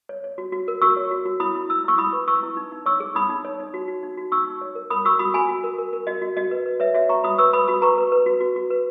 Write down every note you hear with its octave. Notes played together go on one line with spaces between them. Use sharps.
C#5
C#5
F#4
F#4
A#4
F#4 C#6 E6
C#5
F#4
F#4
E4 B5 D#6
E4
E4 E6
E4 C#6 E6
E4 B5 D#6
B4
E4 C#6 E6
E4
D#4
D#4
C#5 C#6 E6
G#4
D#4 B5 D#6
D#4
C#5
D#4
F#4
F#4
D#4
F#4
D#4 C#6 E6
D#4
C#5
A#4
A#4 B5 D#6
F#4 C#6 E6
F#4 B5 D#6
F#4 G#5 B5
F#4
A#4
A#4
A#4
F#4 D#5
F#4
F#4 D#5
B4
B4
B4 C#5 E5
F#4 C#5 E5
F#4 A#5 C#6
F#4 B5 D#6
B4 C#6 E6
B4 B5 D#6
F#4 B5 D#6
B4 A#5 C#6
B4
B4
F#4
F#4
F#4
B4